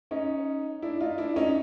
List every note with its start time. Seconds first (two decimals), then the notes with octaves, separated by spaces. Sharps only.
0.11 C#4 D#4
0.82 D4 E4
1.01 D#4 F4
1.18 D4 E4
1.36 C#4 D#4